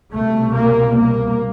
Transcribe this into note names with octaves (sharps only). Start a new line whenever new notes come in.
C2 B2 A3
A#3
A#3